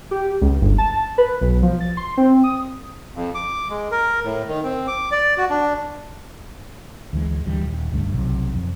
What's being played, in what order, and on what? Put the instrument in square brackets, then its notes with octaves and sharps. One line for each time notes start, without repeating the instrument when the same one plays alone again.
[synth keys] G4
C#2
G1
A5
B4
B1
F3
A6
C6
C4
D#6
[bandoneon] F2
D6
G#3
A#4
A2
D#3
C4
D6
D5
F#4
D4
[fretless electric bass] D2 E3 G#3
D2 E3 G3
D#1
C#2 G2 D3 A3
B1 C3 F#3 A3
F2